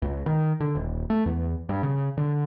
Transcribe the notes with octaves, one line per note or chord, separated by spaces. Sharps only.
C#2
D#3
D3
D#1
A3
E2
G2
C#3
D3